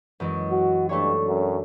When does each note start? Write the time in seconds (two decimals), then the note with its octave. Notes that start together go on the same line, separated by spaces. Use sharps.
0.20 F#2 E3 G#3
0.51 F#4
0.89 G2 A3 D4 C#5
1.27 F#2